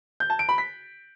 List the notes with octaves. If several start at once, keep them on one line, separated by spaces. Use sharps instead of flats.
G6
A5
D7
B5
B6